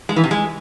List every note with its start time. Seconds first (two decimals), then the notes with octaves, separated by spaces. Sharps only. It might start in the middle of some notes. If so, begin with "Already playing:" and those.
0.09 G#3
0.16 E3
0.24 C3
0.31 G#3